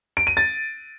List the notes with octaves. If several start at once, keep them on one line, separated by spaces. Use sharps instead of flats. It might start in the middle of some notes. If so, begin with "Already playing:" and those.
D7
D#7
A6